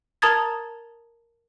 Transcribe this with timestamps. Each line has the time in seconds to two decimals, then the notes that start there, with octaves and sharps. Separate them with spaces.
0.22 A#4 A5 A#5 D#6 G#6 A6